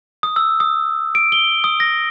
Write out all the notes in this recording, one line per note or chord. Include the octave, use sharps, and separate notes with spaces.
D#6
E6
D#6
D7
G7
D#6
A#6